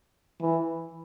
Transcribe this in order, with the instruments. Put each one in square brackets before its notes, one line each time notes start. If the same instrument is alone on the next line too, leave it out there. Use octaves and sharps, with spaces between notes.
[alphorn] E3